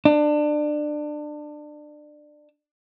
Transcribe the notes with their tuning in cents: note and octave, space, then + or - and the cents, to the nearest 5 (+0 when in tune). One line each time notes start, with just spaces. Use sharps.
D4 +25